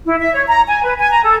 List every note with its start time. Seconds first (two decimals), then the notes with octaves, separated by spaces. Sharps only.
0.05 E4
0.20 E5
0.34 C#5
0.47 A#5
0.67 G#5
0.84 B4
0.99 G#5
1.11 A#5
1.24 A4